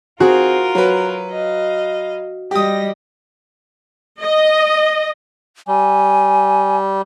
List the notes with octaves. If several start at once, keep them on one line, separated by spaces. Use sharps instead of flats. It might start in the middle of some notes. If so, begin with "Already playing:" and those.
C4 F4 F#4 G#4 A#4
F#3 B4
D#5 F5
G3 G4 D#5 D#6 A#6
D#5
G3 G#5